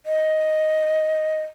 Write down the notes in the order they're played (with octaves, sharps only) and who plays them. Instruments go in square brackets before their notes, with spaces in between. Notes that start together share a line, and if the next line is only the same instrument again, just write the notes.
[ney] D#5